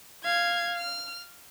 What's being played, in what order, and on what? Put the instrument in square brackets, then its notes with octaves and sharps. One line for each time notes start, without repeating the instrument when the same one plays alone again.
[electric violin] F5 [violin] G#6
[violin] F6